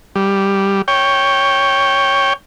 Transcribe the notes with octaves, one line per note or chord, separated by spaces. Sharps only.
G3
C#5 G5